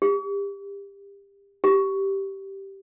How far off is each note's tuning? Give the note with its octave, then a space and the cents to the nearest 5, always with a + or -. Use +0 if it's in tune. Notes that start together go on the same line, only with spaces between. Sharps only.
G4 +30
G4 -10